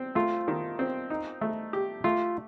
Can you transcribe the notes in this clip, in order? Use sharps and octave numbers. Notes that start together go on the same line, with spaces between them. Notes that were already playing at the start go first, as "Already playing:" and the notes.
Already playing: C4
A3 F4
D#3
C4
D#4
A3
G4
A3 F4